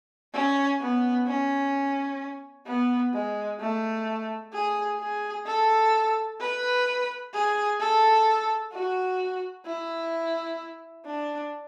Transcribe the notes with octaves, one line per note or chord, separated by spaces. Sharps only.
C#4
B3
C#4
B3
G#3
A3
G#4
G#4
A4
B4
G#4
A4
F#4
E4
D4